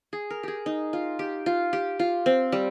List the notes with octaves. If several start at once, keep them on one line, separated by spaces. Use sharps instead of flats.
G#4
A#4
G4 G#4
D#4
F4
G4
F4
G4
F4
C4
G3